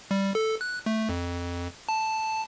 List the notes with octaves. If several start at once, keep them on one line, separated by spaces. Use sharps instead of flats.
G3
A4
F#6
A3
F2
A5